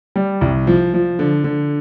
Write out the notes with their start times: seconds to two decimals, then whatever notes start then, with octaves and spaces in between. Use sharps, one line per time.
0.16 G3
0.41 C2
0.67 F3
0.94 F3
1.19 D3
1.44 D3